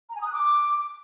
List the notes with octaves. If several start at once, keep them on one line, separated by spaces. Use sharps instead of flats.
A#5
G#5
D#6
F#6
D6